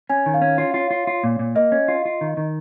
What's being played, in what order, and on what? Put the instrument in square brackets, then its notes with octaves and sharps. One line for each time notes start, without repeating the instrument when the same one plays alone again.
[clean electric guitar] C#4 [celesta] G#5
[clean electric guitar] D#3
[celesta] F5
[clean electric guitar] C#4
[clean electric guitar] F4 [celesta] C#5
[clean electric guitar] F4
F4
F4
A#2
A#2
[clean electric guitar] A#3 [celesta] D#5
[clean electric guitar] C#4
F4
F4
D#3
D#3